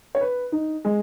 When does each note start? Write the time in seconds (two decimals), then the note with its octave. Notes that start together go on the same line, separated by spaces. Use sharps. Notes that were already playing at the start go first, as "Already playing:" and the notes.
0.15 C#5
0.21 B4
0.52 D#4
0.85 G#3